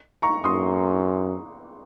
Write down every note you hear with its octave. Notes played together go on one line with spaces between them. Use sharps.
A#5 C#6
F#2 C6 D#6